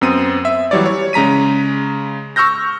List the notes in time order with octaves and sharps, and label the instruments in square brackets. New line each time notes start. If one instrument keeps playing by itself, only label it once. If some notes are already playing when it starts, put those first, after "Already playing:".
[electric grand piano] F#2 B3 C4 D#6 D#7
E5
E3 F#3 G3 C#5 D5
C#5
C#3 G#3 A#5 B6 D#7
C#6 E6 F6 G6 A#6